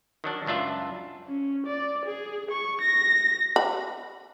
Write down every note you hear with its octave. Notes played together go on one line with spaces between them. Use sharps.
D#3 F#3 D4
C#2 F#2 D4 F4 E5
C#4
D5
G#4
C#6
A#6
B5